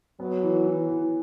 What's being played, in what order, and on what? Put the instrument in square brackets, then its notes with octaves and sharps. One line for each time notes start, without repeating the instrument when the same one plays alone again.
[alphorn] F#3 [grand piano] B3
[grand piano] E3
E3
E3